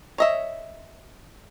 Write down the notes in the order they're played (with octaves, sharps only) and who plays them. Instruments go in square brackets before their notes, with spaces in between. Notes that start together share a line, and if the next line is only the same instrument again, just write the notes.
[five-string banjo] C#5 D#5 E5